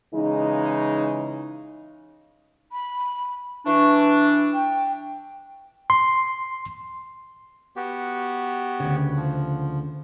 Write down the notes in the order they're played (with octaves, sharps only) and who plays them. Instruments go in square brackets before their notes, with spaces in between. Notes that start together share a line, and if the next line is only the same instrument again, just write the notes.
[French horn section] C#3 E3 G#3 D#4
[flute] B5
[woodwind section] E3 D4 [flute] C#6
[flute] G5
[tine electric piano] C6
[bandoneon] B3 F#4 G4
[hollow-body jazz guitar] D2 C#3
[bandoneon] F3